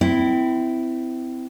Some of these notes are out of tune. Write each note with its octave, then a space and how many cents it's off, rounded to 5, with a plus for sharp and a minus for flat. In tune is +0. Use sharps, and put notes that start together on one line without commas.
C4 -25 E4 +0